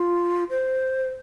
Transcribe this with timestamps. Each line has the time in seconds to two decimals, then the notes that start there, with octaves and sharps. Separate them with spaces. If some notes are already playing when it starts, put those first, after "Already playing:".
Already playing: F4
0.50 C5